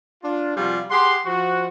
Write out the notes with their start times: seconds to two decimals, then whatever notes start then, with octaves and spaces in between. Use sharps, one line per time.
0.24 D4 F4
0.57 C3 F3 G3 F4 F#4 G#4
0.91 G4 G#4 F#5 C6
1.26 F3 F#4